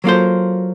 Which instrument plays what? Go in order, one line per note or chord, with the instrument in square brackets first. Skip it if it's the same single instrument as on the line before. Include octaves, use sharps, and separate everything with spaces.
[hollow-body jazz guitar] F#3 A#3 F4 A4 C5